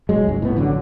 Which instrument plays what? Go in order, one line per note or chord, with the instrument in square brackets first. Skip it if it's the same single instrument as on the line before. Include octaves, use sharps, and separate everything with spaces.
[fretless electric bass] E1 F#3 G#3
C#2 G#2
A2 B3
A1 D3 F#3